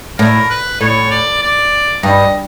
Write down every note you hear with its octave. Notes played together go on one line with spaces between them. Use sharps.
A2 A#4
B4
A2 C#5
D5
D5
G2 D#5